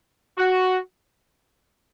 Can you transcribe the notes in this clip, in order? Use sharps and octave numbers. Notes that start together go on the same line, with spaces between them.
F#4